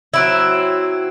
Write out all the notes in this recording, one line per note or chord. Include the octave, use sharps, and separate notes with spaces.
F#3 C4 E4